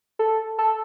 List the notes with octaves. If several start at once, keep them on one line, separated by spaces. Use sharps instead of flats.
A4
A4